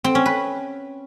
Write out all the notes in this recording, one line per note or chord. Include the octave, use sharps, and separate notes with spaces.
C4
C#4
B4